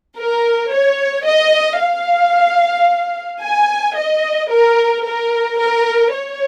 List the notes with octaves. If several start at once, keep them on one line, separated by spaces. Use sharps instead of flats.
A#4
C#5
D#5
F5
G#5
D#5
A#4
A#4
A#4
C#5